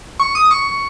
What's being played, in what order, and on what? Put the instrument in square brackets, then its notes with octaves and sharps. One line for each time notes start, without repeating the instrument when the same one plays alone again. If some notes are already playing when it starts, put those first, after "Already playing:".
[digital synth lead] C#6
D#6
C#6